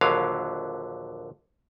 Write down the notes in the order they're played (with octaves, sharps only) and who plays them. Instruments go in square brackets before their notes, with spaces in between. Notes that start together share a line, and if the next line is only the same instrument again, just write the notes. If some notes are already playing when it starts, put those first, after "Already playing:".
[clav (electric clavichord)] A#1 D#2 D3 F#3 F5